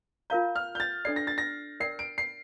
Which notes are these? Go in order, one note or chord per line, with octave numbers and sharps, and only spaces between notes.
F4 A#4 F5 A#5 G6
F6
G6
A6
D4 A4 D5 C7
A#6
A6
A#6
A#4 D5 G5 C7
D7
C7